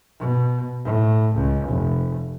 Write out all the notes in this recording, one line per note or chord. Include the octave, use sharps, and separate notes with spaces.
B2
A2
C#2
F1